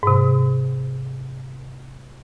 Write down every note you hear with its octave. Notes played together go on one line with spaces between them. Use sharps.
G#2 C3